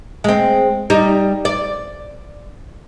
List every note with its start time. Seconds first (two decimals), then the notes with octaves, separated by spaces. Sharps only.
0.24 G#3 C4
0.90 G3 D#4
1.45 D5